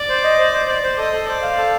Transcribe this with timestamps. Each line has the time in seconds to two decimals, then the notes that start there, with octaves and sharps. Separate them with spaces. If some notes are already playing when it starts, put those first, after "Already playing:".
Already playing: D5
0.09 C5
0.23 D#5
0.39 C5
0.53 C5
0.68 C5 D5
0.83 C5
0.98 A4 D#5
1.13 A4
1.28 C5 D5
1.42 F5
1.58 A4